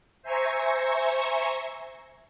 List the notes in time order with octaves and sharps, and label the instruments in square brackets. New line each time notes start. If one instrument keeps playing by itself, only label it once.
[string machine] C5 E5 G#5 A#5 C#6